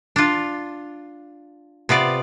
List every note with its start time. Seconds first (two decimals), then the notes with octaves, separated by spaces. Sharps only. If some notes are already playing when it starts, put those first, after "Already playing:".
0.16 D4 F4
1.89 C3 B3 F4 D5